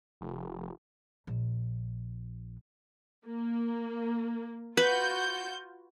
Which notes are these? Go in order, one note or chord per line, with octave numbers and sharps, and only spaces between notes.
F1
A#1
A#3
F4 F#4 B4 G6